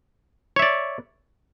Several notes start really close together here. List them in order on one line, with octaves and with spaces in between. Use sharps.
C#5 E5 D5